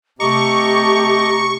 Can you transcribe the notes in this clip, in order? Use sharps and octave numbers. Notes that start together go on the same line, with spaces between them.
C3 A3 G4 D#5 A#5 C#6 D6